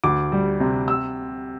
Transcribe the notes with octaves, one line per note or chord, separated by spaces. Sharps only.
D2 D6
G3
C3
E6